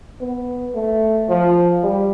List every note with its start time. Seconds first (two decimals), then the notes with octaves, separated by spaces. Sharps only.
0.21 B3
0.75 A3
1.29 F3
1.84 G3